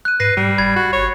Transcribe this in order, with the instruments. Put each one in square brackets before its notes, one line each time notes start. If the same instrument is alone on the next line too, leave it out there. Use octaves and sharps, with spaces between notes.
[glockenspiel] F#6 D#7
[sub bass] G#2 [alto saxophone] B4 [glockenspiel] A#6 C7 D#7
[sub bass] G#2 [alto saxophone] G3
[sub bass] F#1 [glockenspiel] B5 G#6 A6
[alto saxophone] F#4
[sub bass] G#1 [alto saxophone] C#5